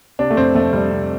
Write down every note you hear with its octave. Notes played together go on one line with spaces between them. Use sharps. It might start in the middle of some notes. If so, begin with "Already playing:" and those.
C3 D4
A3
F2 C4
F2 A3
C3 G3
C3